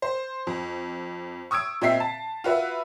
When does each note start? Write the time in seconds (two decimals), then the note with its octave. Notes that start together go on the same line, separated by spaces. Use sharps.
0.02 C5
0.47 F2
1.51 C#6 D#6 E6 G#6 D7
1.82 A#2 C4 D#5 E5 B6 C7
2.00 A5
2.44 F4 F#4 B4 E5